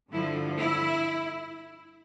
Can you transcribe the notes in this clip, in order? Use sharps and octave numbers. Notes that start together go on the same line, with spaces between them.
G2 D3 F3 E4
E4